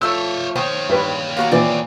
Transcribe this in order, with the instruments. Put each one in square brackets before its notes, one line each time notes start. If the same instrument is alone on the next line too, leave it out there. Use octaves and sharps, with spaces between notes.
[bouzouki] F3 A3 A4 [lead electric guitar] C5 C#5 [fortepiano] E6
[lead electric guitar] D#2 C#5 [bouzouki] D#3 C5
[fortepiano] G2 B4
[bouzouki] A#3 F#4 A#5
[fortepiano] A#2 E3 C4 [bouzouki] D5